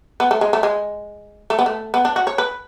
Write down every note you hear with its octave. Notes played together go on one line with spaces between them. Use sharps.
B3
A3
G#3
A3
G#3
A3
B3
A3
B3
D4
F#4
C#5
B4